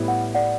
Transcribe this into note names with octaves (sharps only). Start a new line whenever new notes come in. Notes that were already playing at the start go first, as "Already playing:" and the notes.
Already playing: A2 G3 B3 E4
F#5
D5 F#5